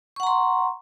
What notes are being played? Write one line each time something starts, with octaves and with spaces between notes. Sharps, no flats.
F#5 A#5 C6 C#6